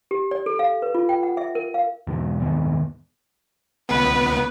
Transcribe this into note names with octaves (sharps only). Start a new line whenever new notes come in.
G4
D5
A4
F5
B4
F4
G5
F#5
E5
A#4
F5
E1 E2 G#2 B2
D#1 G#2 D#3 B3
C#2 B3 B4